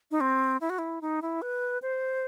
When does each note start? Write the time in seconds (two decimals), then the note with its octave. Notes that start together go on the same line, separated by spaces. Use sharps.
0.11 D#4
0.20 C4
0.61 E4
0.70 F#4
0.78 E4
1.01 D#4
1.22 E4
1.42 B4
1.82 C5